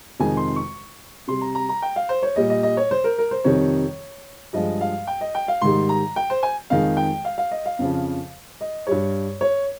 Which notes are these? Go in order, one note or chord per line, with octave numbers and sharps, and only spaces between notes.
F2 C3 D#3 G#3 G#5
C6
C#6
C3 G3 C6
A#5
A#5
A#5
G5
F5
C5
C#5
A#2 G3 D#5
D#5
D#5
C#5
C5
A#4
A#4
C5
F2 C3 D#3 G3 C#5
G2 F3 G#3 D#5
F5
G5
D#5
G5
F5
G#2 D#3 G3 C6
A#5
G5
C5
G#5
F2 D#3 G#3 F5
G5
F5
F5
D#5
F5
F2 C#3 F3
D#5
G2 G3 C#5
C#5